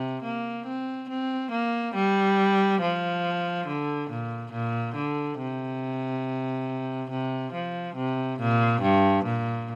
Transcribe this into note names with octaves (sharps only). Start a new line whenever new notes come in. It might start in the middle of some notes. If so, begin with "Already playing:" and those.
Already playing: C3
A#3
C4
C4
A#3
G3
F3
D3
A#2
A#2
D3
C3
C3
F3
C3
A#2
G2
A#2